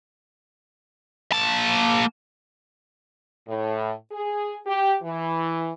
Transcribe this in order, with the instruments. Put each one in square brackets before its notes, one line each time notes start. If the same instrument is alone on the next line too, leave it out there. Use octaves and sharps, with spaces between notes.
[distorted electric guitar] A#3 A5
[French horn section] A2
G#4
G4
E3